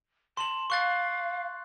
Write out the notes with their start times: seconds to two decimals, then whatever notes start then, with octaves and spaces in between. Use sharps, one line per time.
0.37 A5 C6 F#7
0.70 F5 C#6 F#6 A6